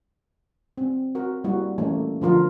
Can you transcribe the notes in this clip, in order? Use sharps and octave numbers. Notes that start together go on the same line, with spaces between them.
C4
F#4 A#4
G3 A#3 E4 F#4
E3 A3 A#3 C#4
D3 F3 F4 A#4